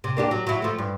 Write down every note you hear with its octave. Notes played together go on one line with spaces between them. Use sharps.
C3
A#3 D4 G4
F#3
F#3 E4
F3 A3
G2